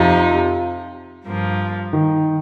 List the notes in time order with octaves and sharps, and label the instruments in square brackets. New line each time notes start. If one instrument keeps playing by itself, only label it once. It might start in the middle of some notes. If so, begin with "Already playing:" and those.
Already playing: [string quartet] F2 C3 F3 D#4 [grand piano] F4
[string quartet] G2 F3 A#3
[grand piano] D#3